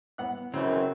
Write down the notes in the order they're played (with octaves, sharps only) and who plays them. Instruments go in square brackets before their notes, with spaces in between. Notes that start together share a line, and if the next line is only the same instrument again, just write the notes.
[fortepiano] B3 F#5 F#6
[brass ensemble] F#2 [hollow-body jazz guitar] C#3 [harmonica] E3 C4